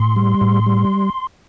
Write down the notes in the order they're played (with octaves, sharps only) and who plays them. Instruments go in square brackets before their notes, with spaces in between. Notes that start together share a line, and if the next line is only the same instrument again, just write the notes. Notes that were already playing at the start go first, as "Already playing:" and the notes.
Already playing: [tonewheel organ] A2 C6
G3
A2
G3